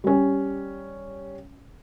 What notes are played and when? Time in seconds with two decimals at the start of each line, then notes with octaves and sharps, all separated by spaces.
0.04 G3 C#4